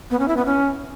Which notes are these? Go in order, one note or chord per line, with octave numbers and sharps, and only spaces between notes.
B3
C#4
E4
B3
C#4